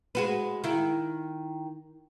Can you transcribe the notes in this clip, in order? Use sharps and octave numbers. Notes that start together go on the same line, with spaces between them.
G#3 F#4 B4
D#3 E4